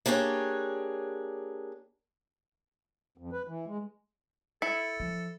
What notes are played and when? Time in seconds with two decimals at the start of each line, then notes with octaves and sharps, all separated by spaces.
0.06 A#3 D4 G4 G#4 C#5
3.18 F2
3.33 B4
3.48 E3
3.67 G#3
4.62 E4 A4 C#7
5.00 F3